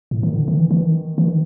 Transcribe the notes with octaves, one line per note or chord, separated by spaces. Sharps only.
A2
D#3
D3
D#3
E3
E3
D#3
E3
D#3